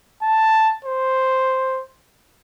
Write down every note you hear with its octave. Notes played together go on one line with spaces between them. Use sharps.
A5
C5